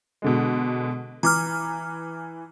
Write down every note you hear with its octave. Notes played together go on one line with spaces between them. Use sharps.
B2 D3 G#3
E3 A#5 D6 F6